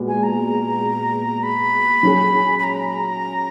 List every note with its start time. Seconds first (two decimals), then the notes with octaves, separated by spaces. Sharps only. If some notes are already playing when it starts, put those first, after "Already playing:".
Already playing: A#2 G#3 B3 F#4
0.08 G#5
0.23 A#5
1.43 B5
2.03 F#3 C#4 G#4
2.59 B5
2.64 A#5